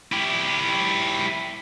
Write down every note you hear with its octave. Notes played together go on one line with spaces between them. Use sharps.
E4 G4